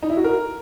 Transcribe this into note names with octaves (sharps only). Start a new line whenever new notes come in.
D#4
E4
F#4
A#4